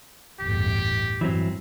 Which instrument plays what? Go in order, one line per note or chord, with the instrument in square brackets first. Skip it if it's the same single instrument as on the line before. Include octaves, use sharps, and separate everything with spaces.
[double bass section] G1 E2 A2 [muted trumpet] G4
[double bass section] G2 [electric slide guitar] E3 F#3 C4